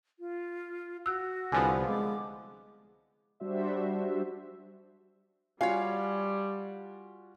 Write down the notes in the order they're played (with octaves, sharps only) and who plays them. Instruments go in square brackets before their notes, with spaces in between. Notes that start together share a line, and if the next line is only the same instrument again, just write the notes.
[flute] F4
[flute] F#4 [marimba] E6 F#6
[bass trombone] C2 [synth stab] D3 F3 B3 [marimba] G#5
[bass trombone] G#3 [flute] D6
[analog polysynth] G3 D4 F#4 C5 E5
[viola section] G3 [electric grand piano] F4 F#4 G#5 [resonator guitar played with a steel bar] C#5 F5